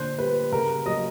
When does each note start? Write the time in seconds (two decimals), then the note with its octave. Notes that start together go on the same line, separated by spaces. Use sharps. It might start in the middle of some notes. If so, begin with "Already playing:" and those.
Already playing: A#2 D3 C5
0.19 G3 B4
0.52 C#3 A#4
0.86 F#3 D#5